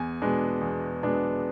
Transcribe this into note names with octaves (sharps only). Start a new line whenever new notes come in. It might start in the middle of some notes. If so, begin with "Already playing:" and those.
Already playing: E2 G#5
B2 G#3 B3 D4
E2
B2 G#3 B3 D4